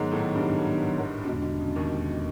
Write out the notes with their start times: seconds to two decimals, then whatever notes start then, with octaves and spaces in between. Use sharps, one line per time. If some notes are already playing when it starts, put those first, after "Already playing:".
Already playing: G#2 D#3 F#3 G#3 B3 D#4
0.11 A2 A3
0.35 G2 G3
1.25 E2 B2 D3 G#3
1.42 D3
1.60 C#3
1.76 D#2 D#3